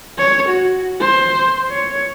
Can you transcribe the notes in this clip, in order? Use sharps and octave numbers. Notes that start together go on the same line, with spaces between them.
C#5
F#4
C5
C#5